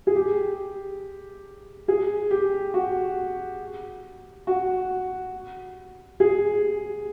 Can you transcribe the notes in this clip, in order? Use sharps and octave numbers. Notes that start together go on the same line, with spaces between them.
G#4
G4
G#4
G4
F#4
F#4
G#4